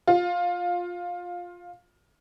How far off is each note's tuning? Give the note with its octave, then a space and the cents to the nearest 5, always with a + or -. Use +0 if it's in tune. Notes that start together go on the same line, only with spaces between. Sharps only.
F4 +15